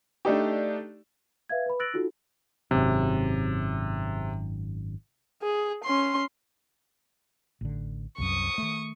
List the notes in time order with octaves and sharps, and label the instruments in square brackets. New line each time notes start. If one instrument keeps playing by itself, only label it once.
[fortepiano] A3 D4 D#4 G4
[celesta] B4 E5 F5 G#6
B4 B5
E6 F#6 A6 A#6 D7 F#7
D#4 F4 F#4 A4
[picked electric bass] G#1 F#2 [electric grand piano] C3
[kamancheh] G#4
C#4 C6
[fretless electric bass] A1 D3
[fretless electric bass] C2 F#2 F#3 [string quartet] C#6 D#6
[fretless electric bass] D#3 A3